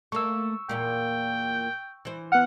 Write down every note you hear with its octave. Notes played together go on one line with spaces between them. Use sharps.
A3 A#3 C#6 E6
E2 A#2 A#3 G5
E3 C5
B3 F#5 F6